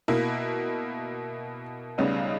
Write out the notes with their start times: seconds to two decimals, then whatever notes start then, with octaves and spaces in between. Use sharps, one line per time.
0.08 B2 A#3 E4
1.98 C#2 C#3 G3 B3 D#4